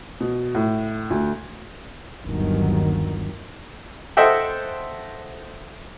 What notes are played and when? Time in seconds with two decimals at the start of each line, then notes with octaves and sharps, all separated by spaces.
0.21 B2
0.55 A2
1.10 D2
2.23 G1 D#2 D#3 F#3
4.17 A4 C5 D#5 E5 F#5 G5